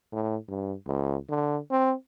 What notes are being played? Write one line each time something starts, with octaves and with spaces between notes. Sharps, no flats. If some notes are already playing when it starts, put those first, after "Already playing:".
A2
G2
C#2
D3
C4